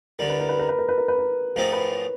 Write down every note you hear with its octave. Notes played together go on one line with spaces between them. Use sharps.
D2 D3 G3 A#4
B4
A#4
B4
A#4
B4
A#4
B4
A#4
B4
A#4
G#2 F3 A3 C4 D#4 A#4
B4
C#5